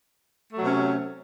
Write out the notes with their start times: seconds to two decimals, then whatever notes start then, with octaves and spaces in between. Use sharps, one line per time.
0.53 A3
0.57 F#3
0.62 C3
0.67 C#4